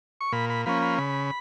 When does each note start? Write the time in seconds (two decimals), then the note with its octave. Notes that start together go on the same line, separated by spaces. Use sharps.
0.21 C#6
0.32 A#2 B5
0.50 B5
0.66 F3 A#3 C#4 B5
0.82 B5
0.98 C#3 B5